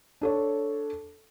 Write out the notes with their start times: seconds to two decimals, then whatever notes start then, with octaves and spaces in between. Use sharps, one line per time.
0.21 D4 A4 C#5